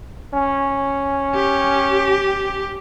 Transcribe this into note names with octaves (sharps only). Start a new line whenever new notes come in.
C#4
G4